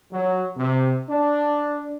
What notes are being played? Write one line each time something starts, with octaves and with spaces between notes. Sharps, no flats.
F#3
C3
D4